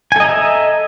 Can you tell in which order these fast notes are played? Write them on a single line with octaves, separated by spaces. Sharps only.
G#5 A4 D#5 A#5 E5